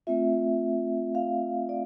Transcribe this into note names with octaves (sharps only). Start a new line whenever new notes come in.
A3 C4 F4 E5
F5
D5